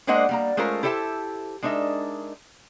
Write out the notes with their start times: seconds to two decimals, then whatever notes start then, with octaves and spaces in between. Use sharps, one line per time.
0.07 G#3 A#3 D4 C5 D#5 F#5
0.29 G3 A#3 A#5
0.57 G#3 A3 C#4 F4 A#4 C5
0.83 E4 G4 A4 C5 E5 A5
1.62 G#3 D4 D#4 A#4 E5